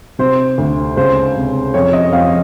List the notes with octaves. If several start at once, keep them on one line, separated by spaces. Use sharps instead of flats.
C3 C5
D2
C#2 C5
C3
F2 C#5
D#5
F2 F5